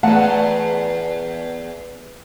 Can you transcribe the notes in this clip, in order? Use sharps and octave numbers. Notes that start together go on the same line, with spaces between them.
E2 A3 B4 F#5 A5